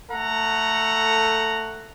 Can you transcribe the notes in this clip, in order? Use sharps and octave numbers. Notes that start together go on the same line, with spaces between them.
A3 A4 F#5 A#5